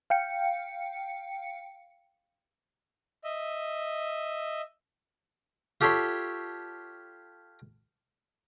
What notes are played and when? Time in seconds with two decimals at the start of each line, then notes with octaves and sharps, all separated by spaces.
0.10 F5 G5 C#7
3.24 D#5 E5
5.81 F4 G4 A4 C#5 B5 C6